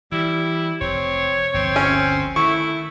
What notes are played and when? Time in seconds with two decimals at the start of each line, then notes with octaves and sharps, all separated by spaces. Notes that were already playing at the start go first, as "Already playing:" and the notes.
0.12 E3 G3 E4
0.81 F1 C4 C#5
1.54 G1 D2 F3 C4
1.76 C#4
2.36 D#3 A3 E4 C#6